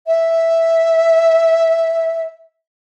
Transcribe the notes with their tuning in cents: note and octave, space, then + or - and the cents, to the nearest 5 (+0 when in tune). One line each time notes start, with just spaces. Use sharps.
E5 -5